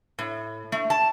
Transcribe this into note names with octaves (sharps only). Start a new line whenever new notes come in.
A2
A3
A5